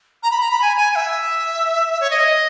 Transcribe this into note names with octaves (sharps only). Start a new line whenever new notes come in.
A#5
B5
A#5
B5
G#5
G#5
G#5
E5
C#5
D#5